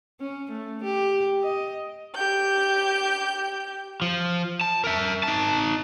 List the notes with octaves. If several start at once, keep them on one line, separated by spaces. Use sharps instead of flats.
C#4
A3
G4
D#5
G4 G6
F3
A5
A#4 E5
D#4 A5